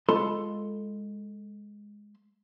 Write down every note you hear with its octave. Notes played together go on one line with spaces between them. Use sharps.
G#3 F4 A4 B5 C6